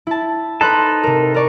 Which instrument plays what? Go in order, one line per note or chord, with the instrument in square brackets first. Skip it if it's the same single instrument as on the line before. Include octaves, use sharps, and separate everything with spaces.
[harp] E4 A5
[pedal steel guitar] D#4 A4 A5 [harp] B4 C5 F#6
[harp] C3 A#4
A#4 D5 C#6